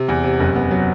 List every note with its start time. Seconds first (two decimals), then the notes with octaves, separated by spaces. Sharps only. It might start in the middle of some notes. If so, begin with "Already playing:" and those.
Already playing: C3
0.09 E2
0.23 C3
0.40 F#1
0.56 B3
0.71 F#3